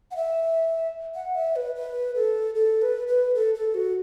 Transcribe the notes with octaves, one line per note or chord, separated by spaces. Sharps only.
F#5
E5
F#5
E5
B4
B4
A4
A4
B4
B4
A4
A4
F#4